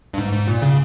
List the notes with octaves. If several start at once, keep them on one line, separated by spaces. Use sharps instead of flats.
G2
G#2
G#2
A#2
C#3